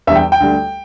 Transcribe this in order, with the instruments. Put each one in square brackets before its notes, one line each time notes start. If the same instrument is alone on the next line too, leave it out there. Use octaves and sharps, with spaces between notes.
[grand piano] E2 D3 G3 E5
G5
G5
D2 D3 G3